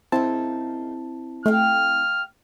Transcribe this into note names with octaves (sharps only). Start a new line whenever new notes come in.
C#3 A#3 C4 D#4 E4 A5
A3 G4 F5 G5 F6